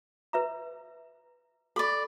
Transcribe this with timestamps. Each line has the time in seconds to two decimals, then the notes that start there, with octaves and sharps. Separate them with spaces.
0.33 B4 E5 A#5
1.76 A4 D5 B5 C#6